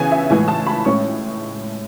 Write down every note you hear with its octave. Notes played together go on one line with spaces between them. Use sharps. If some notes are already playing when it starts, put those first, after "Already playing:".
Already playing: C#3 E3 B3 G#5
E5
A2 E3 G#3 G#5
A5
B5
A2 G#3 C#4 C#6